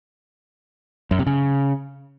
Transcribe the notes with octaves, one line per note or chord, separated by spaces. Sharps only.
F#2
C3
C#3